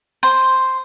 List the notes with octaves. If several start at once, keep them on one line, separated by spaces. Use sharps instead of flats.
C5